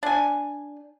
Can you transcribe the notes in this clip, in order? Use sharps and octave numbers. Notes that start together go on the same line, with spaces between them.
D4 G#5